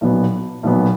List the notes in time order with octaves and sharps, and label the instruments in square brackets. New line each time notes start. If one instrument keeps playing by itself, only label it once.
[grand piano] B1 A#2 F#3 B3
B1 A#2 F#3 B3